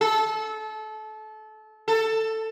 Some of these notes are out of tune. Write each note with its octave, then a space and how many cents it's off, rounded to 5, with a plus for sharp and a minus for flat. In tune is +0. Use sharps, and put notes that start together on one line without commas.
A4 -25
A4 +10